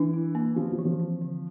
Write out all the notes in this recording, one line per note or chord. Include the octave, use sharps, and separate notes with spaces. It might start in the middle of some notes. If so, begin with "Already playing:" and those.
Already playing: E3 D4
E4
A#3
F3 D4
F3
E3
F3
C4
D3